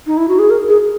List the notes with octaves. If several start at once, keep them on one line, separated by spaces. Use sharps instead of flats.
D#4
E4
F#4
G#4
A#4
G#4